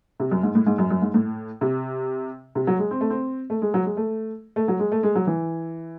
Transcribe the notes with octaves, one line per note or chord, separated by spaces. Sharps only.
C3
F#2
G#2
A2
G#2
F#2
F#2
G#2
A2
C3
C3
F#3
G#3
C4
A3
C4
A3
G#3
F#3
G#3
A3
A3
F#3
G#3
A3
G#3
F#3
E3